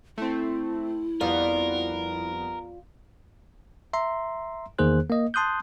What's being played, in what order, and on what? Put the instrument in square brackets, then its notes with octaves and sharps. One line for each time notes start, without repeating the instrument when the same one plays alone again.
[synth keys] A3 C4 [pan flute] E4
[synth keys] F2 G3 B3 [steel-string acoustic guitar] F4 D5 [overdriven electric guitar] A#4
[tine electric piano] E5 A#5 C6
E2 D#3 A#3 G#4 C5 F#6
A#3 D#5
A5 C6 D#6 F#6 G6